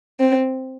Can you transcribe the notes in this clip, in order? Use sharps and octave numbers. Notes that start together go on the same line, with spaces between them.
C4